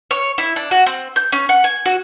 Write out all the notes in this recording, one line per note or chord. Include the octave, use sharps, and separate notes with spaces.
C#5
E4
D4
F#4
C4
G6
C#4
F#5
G#5
F#4